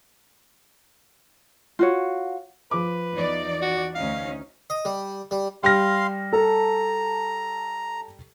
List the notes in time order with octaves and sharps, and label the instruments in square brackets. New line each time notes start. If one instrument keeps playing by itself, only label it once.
[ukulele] F4 F#4 C#5
[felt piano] F3 D6 [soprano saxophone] B4
[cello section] E2 D#4 D5
[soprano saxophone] F#4
[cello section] D2 C#4 D#4 [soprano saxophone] F5
[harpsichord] D#5
G3
G3
[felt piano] G3 F6 A#6 [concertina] F5 C6
[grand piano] A4 A5 [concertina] A#5